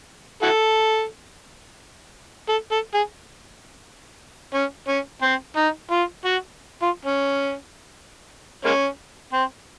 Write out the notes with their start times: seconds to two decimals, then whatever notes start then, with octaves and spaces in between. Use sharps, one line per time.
0.42 E4 F#4 A4
2.49 A4
2.71 A4
2.94 G#4
4.54 C#4
4.88 C#4
5.22 C4
5.57 D#4
5.91 F4
6.25 F#4
6.82 F4
7.05 C#4
8.65 G#3 A#3 C#4
9.33 C4